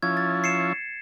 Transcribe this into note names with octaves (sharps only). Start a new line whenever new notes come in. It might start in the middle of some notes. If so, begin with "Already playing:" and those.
F3 C#4 E4 G#6
A6
C7 C#7 E7